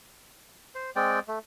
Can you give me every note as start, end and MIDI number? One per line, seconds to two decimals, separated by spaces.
0.75 0.90 72
0.96 1.19 56
0.96 1.19 60
0.96 1.19 74
0.96 1.19 79
1.28 1.39 57